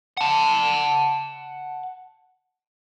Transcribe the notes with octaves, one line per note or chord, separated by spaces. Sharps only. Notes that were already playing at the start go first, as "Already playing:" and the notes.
F#5 A5